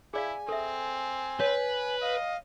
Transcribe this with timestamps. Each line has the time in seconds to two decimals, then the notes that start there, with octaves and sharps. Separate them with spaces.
0.14 E4 G#4 D5 F5 G#5
0.49 C4 A4 E5
1.40 B4 C#5
2.02 D#5 F5